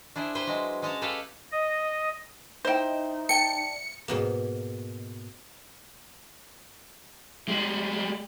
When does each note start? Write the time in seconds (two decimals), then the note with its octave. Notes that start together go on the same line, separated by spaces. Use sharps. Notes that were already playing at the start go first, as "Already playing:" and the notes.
0.16 D4 E4 G#4 C5
0.35 B4 C5 G5
0.47 F#3 G#3
0.82 G#3 C#4 D#5 A5 A#5
1.02 G4 A4 B4 C#5 F5 F#5
1.52 D#5
2.65 D#4 E4 C5 D#5 G5
3.29 D5 G5 A5 C#7
4.08 G#2 B2 A#3
7.48 G3 G#3